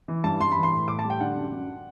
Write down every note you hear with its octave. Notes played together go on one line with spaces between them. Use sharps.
E3
G2 A5
G2 C6
E3 B5
C6
A2
A2 D6
A5
G3
G5
D3 F#5
F#2
F#2